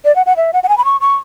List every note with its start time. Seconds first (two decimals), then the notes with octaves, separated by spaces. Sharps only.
0.05 D5
0.16 F#5
0.26 F#5
0.37 E5
0.53 F#5
0.63 F#5
0.69 G#5
0.78 B5
0.85 C#6
1.01 C#6